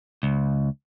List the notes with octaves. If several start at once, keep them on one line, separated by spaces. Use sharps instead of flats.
C#2